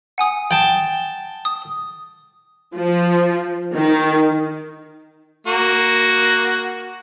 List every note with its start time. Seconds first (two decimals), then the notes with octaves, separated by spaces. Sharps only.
0.18 F#5 G#5 D#6
0.51 G5 A5
1.45 D#6
2.75 F3
3.74 D#3
5.47 A#3 F#4